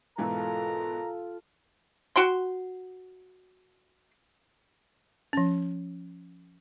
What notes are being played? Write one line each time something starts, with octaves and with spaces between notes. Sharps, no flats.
G#2 B2 E3 F4 A4 A#4 A#5
F#4 G5 C6
F3 C#4